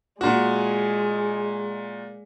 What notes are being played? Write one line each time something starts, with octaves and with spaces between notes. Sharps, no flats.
A#2 G#3 F#4